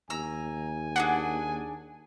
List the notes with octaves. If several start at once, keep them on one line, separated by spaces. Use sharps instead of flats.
D#2 G#5 A#5 E6
D4 E4 G#4 F#5